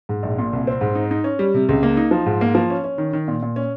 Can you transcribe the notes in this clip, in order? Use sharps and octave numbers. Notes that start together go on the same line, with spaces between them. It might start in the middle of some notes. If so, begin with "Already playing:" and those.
G#2
A#1
A#2
C2
C4
G#2
D#4
D#4
C#4
G3
C3
C#2
A#3
D#4
F3
G#2
A#3
F3
C#4
C#4
D#3
D#3
A#2
A#2
C#4